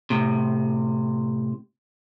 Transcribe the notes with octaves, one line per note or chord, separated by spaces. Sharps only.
A2 C3